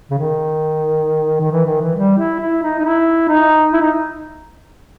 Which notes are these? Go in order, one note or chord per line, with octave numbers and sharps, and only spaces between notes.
C#3
D#3
D#3
E3
D#3
E3
G3
E4
E4
D#4
D#4
E4
D#4
E4
D#4